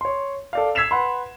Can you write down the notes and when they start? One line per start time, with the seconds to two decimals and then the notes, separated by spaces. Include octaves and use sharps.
0.01 C#5 C6
0.53 A4 D5 F5
0.75 E6 G#6 B6 C7 E7 F7
0.91 B4 F#5 B5 C6